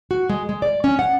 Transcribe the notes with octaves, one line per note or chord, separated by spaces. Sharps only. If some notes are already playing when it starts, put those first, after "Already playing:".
F#4
G#3
G#3
D5
C#4
F#5